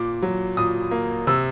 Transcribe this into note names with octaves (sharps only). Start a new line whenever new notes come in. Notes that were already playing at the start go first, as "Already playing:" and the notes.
Already playing: A#2 D6
F#3
A#2 D#6
A#3
C3 E6